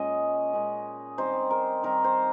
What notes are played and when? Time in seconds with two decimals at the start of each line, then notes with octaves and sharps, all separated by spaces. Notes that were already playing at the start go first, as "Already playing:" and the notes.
Already playing: A#2 G#3 C#4 D#5
0.53 A#2 G#3 C#4
1.18 D#3 G3 C4 D#4 C5
1.50 A#4
1.83 D#3 G3 C4 D#4 A#4
2.04 C5